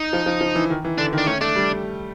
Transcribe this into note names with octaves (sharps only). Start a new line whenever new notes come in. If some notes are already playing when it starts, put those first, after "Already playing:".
Already playing: D#4
F3
F3
F3
E3
D#3
E3
D3 D4
D#3
D4
A3 C#4
A3 D4
G3